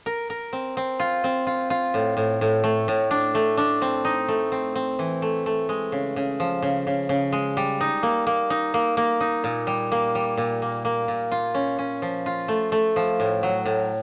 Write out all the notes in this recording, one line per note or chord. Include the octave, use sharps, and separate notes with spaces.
A#4
A#4
C4
C4
F4
C4
F4
F4
A2
A2
A2
A3
A2
D4
A3
D4
C4
D#4
A3
C4
C4
E3
A3
A3
G#3
C#3
C#3
F3
C#3
C#3
C#3
G#3
G3
D#4
A#3
A#3
D#4
A#3
A#3
D#4
A#2
G3
A#3
G3
A#2
A#3
A#3
A#2
F4
C#4
C#4
F3
F4
A3
A3
F3
A2
F#3
A2